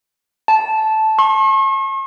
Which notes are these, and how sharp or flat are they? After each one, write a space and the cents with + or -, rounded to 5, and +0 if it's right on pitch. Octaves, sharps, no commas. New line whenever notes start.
A5 -10
C#6 -45